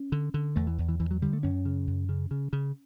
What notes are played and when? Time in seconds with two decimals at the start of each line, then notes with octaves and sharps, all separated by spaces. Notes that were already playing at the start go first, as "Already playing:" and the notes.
Already playing: C#4
0.12 D3
0.34 D3
0.56 E2 A3
0.67 E3
0.78 E2
0.89 E3
1.00 E2 E3
1.11 F#3
1.22 D3 G3
1.33 A3
1.43 F#2 C#4
1.65 C#3
1.87 F#2
2.09 C#3
2.31 C#3
2.53 C#3